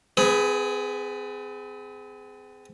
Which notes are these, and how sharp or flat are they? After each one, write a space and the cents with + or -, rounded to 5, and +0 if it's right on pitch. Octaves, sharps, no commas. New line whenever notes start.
C4 -40 G#4 +0 B4 +0